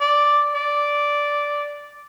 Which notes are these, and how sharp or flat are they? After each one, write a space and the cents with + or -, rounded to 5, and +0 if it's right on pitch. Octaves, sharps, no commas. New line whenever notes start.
D5 +0
D5 -5